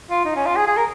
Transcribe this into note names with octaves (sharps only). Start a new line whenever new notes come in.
F4
D#4
C#4
F4
G#4
G#4
A#4